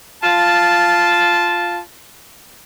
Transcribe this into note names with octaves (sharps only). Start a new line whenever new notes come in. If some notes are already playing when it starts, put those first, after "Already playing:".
F4 A5